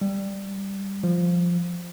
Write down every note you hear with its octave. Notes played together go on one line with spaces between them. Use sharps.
G3
F3